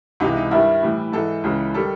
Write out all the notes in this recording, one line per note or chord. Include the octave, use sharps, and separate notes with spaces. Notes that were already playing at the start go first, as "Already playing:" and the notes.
C#2 C3 E3 G#3 D#4
D#4
G2 D#3 G3 E4
A2 E3 G3
G#2 E3 G#3 A4
C#2 C#3 E3 G#3
D#3 G3 A4